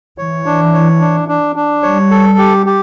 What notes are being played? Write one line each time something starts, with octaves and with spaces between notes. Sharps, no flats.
E3 C#5
D4
C#5
D4
D4
D4
G3 C#5
A4
G4
G4